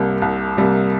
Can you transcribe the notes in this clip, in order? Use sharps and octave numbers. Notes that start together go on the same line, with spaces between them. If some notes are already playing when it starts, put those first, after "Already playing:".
Already playing: C2 C3 G3 A#3
C2
C3 G3 A#3